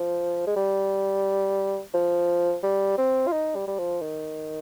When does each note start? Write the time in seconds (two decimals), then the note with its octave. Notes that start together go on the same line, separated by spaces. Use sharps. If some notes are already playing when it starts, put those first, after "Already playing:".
Already playing: F3
0.47 G#3
0.56 G3
1.94 F3
2.63 G3
2.98 C4
3.27 F4
3.32 D#4
3.55 G3
3.67 G3
3.78 F3
4.01 D#3